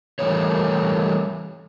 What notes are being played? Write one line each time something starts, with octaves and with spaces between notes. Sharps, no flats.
E3 G3 A3 A#3 C#5